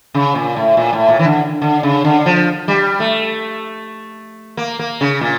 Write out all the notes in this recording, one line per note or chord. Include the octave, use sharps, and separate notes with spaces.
C#3
A#2
A2
A#2
A2
A#2
E3
D3
D3
C#3
D3
F3
G3
A3
A#3
A#3
C#3
A#2